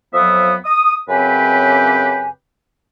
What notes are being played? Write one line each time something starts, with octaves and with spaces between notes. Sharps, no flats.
F2 F3 F#3 B3 E5 D#6
D#6
F#2 C#3 C4 G4 B4 G#5